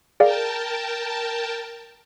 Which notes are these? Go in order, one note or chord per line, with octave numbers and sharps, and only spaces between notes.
G#4 A#4 D5 F5 G5 A5